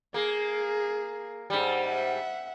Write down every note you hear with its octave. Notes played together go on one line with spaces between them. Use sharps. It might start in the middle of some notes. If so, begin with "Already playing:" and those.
A#3 G#4
G#2 G3
E5 F#5